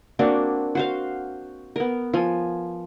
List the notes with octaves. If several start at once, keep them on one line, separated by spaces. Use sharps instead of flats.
A#3 C4 D4 F#4
F#4 C5 F5
B3 A#4
F3 G#5